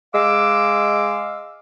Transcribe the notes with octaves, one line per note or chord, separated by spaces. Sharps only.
G#3 F5 D6 E6